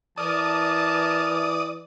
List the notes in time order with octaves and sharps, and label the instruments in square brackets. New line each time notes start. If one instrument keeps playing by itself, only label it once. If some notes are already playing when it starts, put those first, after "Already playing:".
[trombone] E3 [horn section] A#4 A5 [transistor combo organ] D5 D#6